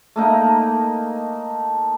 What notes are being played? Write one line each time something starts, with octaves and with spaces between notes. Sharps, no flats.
A3 A#3 D#4